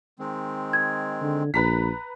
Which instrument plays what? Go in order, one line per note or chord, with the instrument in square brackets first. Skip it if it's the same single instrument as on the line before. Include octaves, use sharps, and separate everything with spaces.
[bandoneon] D#3 G#3 C4
[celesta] G#6
[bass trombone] D3
[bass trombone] A#1 [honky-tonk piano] B4 A#5 B6